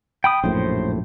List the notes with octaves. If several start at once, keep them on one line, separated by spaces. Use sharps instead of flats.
G5 B5 D#6
A#1 F#2 A2 C5